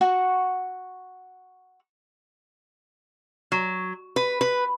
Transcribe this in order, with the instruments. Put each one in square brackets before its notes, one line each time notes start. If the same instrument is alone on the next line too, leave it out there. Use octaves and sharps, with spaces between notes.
[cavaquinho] F#4 F#5 C#6
[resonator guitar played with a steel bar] F#3
B4
B4